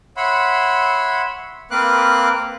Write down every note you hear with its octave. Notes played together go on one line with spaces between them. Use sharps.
C#5 E5 F#5 B5 C6
A#3 C4 B4 F5 D6 F#6